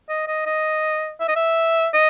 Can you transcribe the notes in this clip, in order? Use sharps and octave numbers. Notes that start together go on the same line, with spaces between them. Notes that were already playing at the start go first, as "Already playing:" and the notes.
D#5
D#5
D#5
E5
D#5
E5
D#5